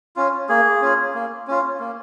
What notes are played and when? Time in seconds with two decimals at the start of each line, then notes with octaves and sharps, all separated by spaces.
0.16 C#4 F4
0.49 A#3 G#4
0.82 C#4 F4
1.15 A#3
1.47 C#4 F4
1.80 A#3